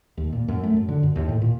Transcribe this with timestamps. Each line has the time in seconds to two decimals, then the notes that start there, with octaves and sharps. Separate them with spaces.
0.17 D#2
0.33 A#2
0.48 F#2
0.63 A3
0.76 F#2
0.88 D3
1.03 F#2
1.16 D#2
1.29 A2
1.41 A#2